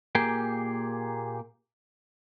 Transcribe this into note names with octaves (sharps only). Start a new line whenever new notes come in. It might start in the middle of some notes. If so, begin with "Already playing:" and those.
A#2 A#3 G4 G#4 G5